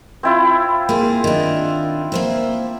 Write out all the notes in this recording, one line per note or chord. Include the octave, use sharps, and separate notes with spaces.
C4 E4 F4
A#3 G#4
D#3 D4
A#3 C5 E5